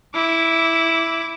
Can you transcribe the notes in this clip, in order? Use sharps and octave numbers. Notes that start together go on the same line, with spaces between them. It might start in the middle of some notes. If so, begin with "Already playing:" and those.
E4 D6